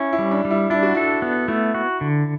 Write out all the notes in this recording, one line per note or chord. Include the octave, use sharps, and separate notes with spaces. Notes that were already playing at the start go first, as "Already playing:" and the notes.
Already playing: C#4 E4
E4
G3
D4
G3
E4
D4 E4
F#4
E4 A4
B3
A3 E4
F#4
D3